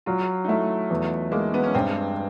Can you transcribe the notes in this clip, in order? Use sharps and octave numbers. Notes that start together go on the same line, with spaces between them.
F#3 F4
D#4
A3 E4
E2
G#3 A#3
B3
C#4
G2 C4